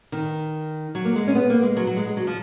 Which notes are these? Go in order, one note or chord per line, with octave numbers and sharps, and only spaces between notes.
D#3
F#3
A#3
G#3
C#4
B3
A#3
G#3
F#3
F#3
G#3
G#3
F#3
F3